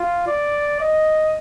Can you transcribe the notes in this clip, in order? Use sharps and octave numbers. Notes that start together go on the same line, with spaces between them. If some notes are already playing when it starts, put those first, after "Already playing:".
Already playing: F4
D5
D#5